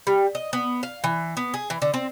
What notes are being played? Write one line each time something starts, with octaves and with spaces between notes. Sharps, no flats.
G3
D#5
B3
F5
E3
B3
G#4
E3
D3
C4